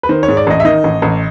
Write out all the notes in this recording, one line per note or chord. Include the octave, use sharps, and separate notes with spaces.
B4
D#3 C5
C#5
G#2
D5
A1 D#5
E5
D#3 D#5
A1
A1